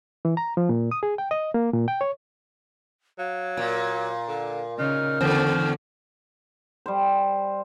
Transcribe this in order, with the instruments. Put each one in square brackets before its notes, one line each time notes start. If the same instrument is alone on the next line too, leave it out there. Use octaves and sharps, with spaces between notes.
[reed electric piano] E3
A#5
F3
A#2
D#6
G#4
G5
D#5
A#3
A#2
G5
C#5
[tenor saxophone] F#3 [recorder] F5
[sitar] A#2
[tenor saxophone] D3
[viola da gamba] C#3 [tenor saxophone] D#4 [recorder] F6
[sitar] E2 [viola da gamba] D3 [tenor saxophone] C5
[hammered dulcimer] G3 C5